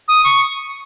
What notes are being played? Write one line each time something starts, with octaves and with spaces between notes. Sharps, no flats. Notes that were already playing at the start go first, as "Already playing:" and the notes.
D#6
C#6